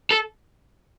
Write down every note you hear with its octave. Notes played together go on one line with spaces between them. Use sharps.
A4